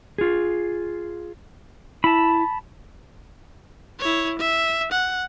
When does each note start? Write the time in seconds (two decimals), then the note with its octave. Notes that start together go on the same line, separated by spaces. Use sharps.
0.18 F4 G#4
2.04 E4 A5 B5
4.00 E4 C#5
4.39 E5
4.92 F#5